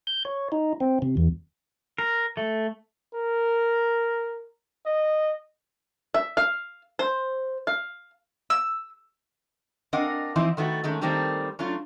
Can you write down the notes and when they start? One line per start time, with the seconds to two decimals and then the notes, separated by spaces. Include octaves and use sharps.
0.07 G6
0.25 C#5
0.52 D#4
0.80 C4
1.02 C3
1.17 E2
1.98 A#4
2.37 A3
3.14 A#4
4.86 D#5
6.14 E5
6.37 F5
6.99 C5
7.67 F5
8.50 E6
9.93 C4 D4 A#4 D#5 F5 F#5
10.36 E3 F3 C4 D#4 E4
10.57 D#3 A3 B3 F#4
10.84 D#3 G#3 A3 C#4
11.01 D#3 G3 A3 A#3 C4
11.59 F#3 A3 C#4 D4 F4